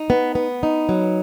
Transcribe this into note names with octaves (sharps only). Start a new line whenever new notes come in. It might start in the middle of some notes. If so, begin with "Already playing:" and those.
Already playing: D#4
B3
B3
D#4
F#3